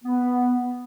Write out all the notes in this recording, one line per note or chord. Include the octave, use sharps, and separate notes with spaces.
B3